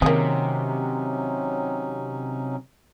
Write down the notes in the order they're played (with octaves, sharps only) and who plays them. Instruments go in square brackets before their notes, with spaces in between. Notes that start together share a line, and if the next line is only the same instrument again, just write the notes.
[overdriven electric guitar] C3 [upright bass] D#3 [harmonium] F#3 C#4 D#4 [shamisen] A#3 G#4